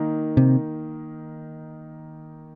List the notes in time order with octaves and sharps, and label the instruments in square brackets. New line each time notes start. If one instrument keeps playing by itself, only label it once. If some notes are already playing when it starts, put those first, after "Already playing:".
Already playing: [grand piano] D#3 A#3 D#4
[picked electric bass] C3